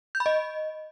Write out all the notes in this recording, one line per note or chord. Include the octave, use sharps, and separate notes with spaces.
G6
B5
D#5